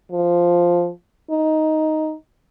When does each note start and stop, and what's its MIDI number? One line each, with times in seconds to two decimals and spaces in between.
0.12 0.90 53
1.31 2.15 63